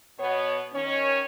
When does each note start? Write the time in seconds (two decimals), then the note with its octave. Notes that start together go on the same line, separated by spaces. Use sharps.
0.19 B2 B3 C#5
0.74 D#3 C#4 C#5